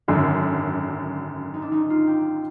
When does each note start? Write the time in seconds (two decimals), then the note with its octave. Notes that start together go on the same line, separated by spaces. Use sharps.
0.08 G#1 F#2 D3 C#4
1.54 D#4
1.62 D4
1.72 D#4
1.90 F4
2.07 G4